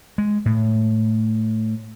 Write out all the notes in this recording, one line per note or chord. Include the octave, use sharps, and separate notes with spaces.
G#3
A2